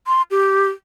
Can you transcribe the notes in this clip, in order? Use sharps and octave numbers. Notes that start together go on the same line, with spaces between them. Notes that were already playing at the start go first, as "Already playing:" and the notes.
C6
G4